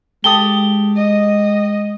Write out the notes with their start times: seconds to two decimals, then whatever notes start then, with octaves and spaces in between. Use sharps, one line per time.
0.24 G#3 G4 A4 D#6 G7
0.96 D#5